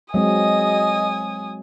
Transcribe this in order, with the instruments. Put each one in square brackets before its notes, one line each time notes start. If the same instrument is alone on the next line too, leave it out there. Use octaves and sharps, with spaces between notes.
[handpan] F#3 G#3 C4 [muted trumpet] D#5 [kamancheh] G#5 D#6